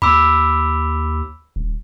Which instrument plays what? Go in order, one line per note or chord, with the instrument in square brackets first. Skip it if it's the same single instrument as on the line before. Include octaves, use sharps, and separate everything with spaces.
[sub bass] D#2 [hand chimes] B5 D6 E6
[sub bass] D#1